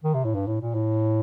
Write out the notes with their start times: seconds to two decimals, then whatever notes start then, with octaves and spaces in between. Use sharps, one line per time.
0.04 D#3
0.14 C3
0.24 A2
0.34 G2
0.47 A2
0.61 A#2
0.74 A2